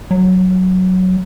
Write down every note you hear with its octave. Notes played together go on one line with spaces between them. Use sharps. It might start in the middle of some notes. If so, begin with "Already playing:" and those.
F#3